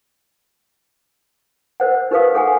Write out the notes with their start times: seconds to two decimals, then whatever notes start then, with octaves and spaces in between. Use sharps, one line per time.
1.80 A#4 C5 F#5
2.11 D#4 G4 A#4 B4 F5 D#6
2.34 G#4 A4 F#5 G#5